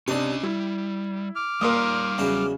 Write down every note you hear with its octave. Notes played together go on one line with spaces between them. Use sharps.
C3 C#4 D4 D#5 C6
G3 E4
D6 F6
D#2 A#2 G3 A#4 D5 F5 C6 D#6
E2 C#3 F#3 D4